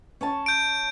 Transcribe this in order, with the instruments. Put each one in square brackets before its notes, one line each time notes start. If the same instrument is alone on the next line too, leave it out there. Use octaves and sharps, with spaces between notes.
[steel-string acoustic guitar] C#4 C#5 A5
[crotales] G6 D7